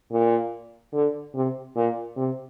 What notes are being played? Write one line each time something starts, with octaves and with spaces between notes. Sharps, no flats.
A#2
D3
C3
A#2
C3